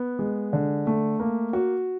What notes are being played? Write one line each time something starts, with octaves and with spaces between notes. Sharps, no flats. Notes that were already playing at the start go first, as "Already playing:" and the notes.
Already playing: B3
G#3
D3
A3
A#3
F#4